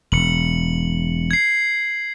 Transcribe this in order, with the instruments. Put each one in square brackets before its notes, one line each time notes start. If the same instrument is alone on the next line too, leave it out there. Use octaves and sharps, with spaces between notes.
[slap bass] E1 [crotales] C#7 F#7
[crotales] G#6 C7